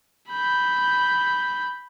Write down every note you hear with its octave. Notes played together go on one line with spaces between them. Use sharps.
B5 G6